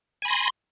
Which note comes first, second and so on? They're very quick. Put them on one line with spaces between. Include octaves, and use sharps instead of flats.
G#5 B5 A#6 C6